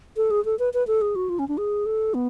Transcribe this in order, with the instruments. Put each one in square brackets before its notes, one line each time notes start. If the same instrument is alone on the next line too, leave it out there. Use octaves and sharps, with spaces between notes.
[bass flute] A4
G#4
A4
B4
B4
A4
G#4
F#4
F4
C#4
D4
G#4
A4
B3